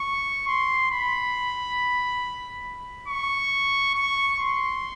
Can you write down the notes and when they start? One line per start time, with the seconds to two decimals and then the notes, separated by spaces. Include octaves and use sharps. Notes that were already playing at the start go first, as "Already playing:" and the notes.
Already playing: C#6
0.48 C6
0.91 B5
3.08 C#6
3.95 C#6
4.39 C6